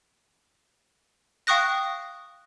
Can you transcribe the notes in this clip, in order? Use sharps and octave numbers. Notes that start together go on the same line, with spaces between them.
F5 G5 C#6 D#6 F#6 A#6